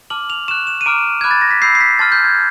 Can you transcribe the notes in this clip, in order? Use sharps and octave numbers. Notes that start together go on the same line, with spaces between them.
A5 D6 F6 F#7
F7
C#6 F#6 E7
E7
D#7
A#5 D6 F6 D7
B5 D6 F#6 G#6
A6
A#6
B6
B5 E6 G6 C7
C7
B6
A5 C6 F6 A6
G6
G#6